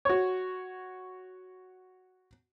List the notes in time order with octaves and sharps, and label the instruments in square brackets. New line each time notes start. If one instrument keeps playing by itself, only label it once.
[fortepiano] F#4 C#5